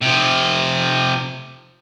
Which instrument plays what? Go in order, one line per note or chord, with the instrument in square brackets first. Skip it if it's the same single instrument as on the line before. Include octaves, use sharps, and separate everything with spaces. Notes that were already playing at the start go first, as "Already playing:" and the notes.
[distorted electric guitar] C3 F3